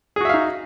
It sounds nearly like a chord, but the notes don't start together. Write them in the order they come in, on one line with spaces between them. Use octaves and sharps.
G#4 F#4 E5 F5 D#4